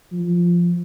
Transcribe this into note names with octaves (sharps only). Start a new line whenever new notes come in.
F3